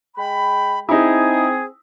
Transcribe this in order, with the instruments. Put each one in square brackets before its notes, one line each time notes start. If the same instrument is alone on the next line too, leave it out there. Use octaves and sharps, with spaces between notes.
[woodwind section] G#3 G5 B5
[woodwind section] C4 G#4 [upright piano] D#4 E4